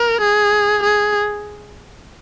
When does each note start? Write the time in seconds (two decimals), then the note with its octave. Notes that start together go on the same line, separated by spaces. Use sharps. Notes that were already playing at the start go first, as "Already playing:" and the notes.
Already playing: A#4
0.21 G#4
0.83 G#4